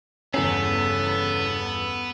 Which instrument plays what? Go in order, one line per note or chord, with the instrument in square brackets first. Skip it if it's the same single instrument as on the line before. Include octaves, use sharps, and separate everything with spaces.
[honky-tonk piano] G1 E2 C7 [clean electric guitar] C#3 C#4 [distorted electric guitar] B3 [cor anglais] A4